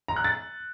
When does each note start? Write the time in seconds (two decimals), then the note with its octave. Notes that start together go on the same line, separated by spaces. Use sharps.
0.08 A#5
0.16 F#6
0.24 A6